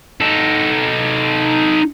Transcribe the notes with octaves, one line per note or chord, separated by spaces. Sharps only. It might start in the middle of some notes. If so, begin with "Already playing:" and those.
D#4 A4